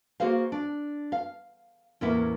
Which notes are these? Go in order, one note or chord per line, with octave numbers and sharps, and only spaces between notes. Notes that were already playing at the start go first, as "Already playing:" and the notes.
A#3 F#4 G#4 C5 F5
D4
F5
E2 A2 A#3 B3 C#4 E4